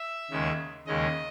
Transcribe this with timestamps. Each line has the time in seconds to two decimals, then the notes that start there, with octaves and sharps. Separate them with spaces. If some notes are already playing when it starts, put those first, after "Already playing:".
Already playing: E5
0.31 D#2 C#3 G#3
0.86 D#2 C#3 G#3 D#5